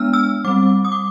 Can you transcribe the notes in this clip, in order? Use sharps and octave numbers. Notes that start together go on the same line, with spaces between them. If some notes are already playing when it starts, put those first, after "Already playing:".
Already playing: G#3 B3 D4 E6 F6
E6
G3 C4 D6
D#6
D6